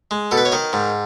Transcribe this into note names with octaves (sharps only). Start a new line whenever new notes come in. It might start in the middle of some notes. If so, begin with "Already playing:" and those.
G#3
B2 A4
B4
C#5
D#3 D#5
G#2